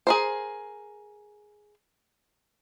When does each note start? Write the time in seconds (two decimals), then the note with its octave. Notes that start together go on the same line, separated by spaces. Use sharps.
0.07 G#4 A#4 C5